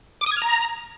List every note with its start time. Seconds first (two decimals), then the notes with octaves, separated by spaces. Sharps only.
0.21 D6
0.26 D#6
0.31 G#6
0.37 F6
0.42 A#5